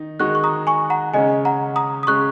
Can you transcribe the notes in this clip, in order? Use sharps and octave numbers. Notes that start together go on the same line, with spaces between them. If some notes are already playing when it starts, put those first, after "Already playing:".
Already playing: D#3 D#4
D#3 G#3 D#4 F#4 C#6 F#6
C#6
A#5 D#6
G#5 C#6
F#5 A#5
C#3 G#3 C#4 D#5 G#5
F#5 A#5
A#5 D#6
D#6
C#3 G#3 C#4 C#6 F#6